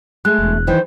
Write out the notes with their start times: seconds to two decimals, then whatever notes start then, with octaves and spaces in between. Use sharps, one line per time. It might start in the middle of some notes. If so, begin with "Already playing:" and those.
0.25 G#3 A3 F#6
0.39 E1
0.67 D#3 E3 C5